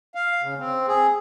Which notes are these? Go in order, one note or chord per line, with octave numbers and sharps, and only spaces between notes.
F5
C#3
C4
G#4